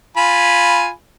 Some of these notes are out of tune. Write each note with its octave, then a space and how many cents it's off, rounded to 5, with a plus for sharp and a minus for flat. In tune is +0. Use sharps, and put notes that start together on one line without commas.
F4 +0 G#5 +0 B5 -5